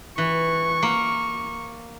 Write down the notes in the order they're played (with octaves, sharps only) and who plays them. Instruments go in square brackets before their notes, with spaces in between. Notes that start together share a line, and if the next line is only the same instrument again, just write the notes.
[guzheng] E3 [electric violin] C#6
[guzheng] A#3